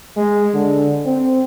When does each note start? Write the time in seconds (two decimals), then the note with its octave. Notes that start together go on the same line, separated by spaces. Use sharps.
0.17 G#3
0.54 D3
1.05 C4